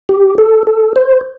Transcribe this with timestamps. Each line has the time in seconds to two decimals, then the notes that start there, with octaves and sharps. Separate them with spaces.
0.09 G4
0.38 A4
0.67 A4
0.96 C5